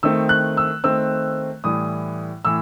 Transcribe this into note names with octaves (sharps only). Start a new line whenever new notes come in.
D#3 A3 C4 E6
F#6
E6
D#3 A3 C4 E6
A2 E3 G3 D#6
A2 E3 E6